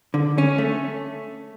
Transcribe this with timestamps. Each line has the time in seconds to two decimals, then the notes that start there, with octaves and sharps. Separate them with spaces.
0.14 D3
0.38 C#4
0.58 A3